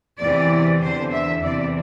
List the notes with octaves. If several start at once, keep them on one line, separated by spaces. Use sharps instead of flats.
E2 C3 E3 D5
E2 D3 C5
E5
E2 C3 E3 D5